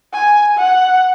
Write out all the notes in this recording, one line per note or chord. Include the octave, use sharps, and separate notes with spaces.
G#5
F#5